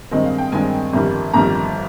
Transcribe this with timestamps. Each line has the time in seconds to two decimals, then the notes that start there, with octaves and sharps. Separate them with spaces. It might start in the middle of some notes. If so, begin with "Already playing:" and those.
0.11 G2 D#3 G#3 C4 D#5
0.25 F5
0.38 G5
0.52 G2 D#3 G#3 C4 G#5
0.93 G1 F2 D#3 G3
1.34 G1 F2 D#3 G3 A#5